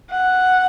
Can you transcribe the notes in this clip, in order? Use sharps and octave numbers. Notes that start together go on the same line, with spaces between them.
F#5